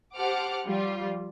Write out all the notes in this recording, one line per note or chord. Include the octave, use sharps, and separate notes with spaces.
G4 C5 F#5 A5 D6 F6
F3 G3 F4